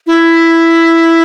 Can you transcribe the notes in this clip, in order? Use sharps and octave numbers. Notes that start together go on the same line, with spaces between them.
E4